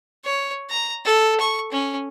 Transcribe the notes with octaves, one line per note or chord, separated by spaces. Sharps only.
C#5
A#5
A4
C#6
C#4